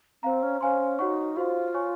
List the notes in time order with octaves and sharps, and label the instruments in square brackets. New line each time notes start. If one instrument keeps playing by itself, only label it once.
[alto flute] C4 [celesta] C5 F5 A#5
[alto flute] C#4
[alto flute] C#4 [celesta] C5 F5 G#5 C6
[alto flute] D#4 [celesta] F#4 C#5 F#5 C#6
[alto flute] F4 [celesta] F#4 C5 F5
[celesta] C#5 G#5 C#6